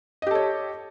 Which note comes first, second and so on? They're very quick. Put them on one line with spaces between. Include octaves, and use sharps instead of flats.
D#5 G4 A4 C#5